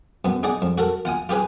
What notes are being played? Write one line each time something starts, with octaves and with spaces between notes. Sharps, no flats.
F#2 B3
D#4 G#4 D5 F#5
F2
F#4 A4 A#4
F4 F#5 G#5 D#6
F4 G4 G#4 B4 G#5